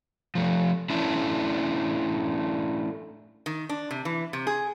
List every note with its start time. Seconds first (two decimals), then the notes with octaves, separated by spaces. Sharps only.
0.35 F3 A3
0.90 A3 C#4 D4 E4 D5
3.46 D#3
3.69 D4
3.91 C3
4.05 E3
4.33 C3
4.47 G#4